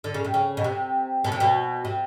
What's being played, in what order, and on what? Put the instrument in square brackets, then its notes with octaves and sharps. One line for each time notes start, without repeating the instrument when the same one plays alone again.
[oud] D3
C#3
C3
C#3
B2
C3
B2
C3
B2
C3